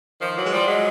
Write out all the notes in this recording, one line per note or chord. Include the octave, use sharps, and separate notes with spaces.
D#3 F3
E3 F#3
G#3
F3 G3
F#3 G#3